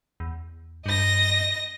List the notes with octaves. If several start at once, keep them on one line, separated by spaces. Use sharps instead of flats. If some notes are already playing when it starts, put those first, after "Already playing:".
E2
G2 D#5 A#6